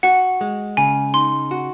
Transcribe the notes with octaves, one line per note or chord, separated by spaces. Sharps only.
F#4 F#5
G#3
C#3 G#5
D#4 C6
F#4